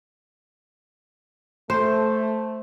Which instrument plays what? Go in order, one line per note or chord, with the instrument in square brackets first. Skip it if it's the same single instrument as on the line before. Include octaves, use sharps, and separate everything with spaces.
[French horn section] A3 [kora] C5